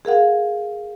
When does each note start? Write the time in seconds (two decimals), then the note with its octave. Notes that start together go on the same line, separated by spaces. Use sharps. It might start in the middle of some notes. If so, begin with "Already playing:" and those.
0.05 G#4 A#4 F5 F#5